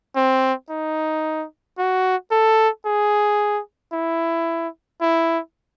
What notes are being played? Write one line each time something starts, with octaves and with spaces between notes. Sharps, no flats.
C4
D#4
F#4
A4
G#4
E4
E4